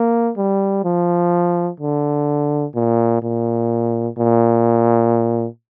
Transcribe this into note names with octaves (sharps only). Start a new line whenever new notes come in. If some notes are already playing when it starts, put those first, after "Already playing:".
Already playing: A#3
G3
F3
D3
A#2
A#2
A#2